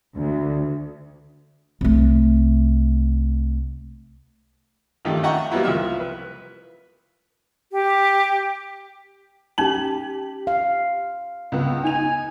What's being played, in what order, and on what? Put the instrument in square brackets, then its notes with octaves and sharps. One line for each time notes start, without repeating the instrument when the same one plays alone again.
[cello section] D2
[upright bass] C2 A3
[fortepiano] G2 D#3 F3 G3 A3
D#5 E5 F#5 G5 A#5 C#6
F#3 G3 A#3 B3 E4
C2 F3 E5 F6
B4
[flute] G4
[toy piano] C#4 D#4 A5 [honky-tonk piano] G4 F#7
[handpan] F5
[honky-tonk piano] C#2 B3
[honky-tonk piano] D#4 F7 [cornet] G#5